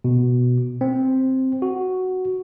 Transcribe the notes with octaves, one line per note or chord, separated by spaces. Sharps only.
B2
C4
F#4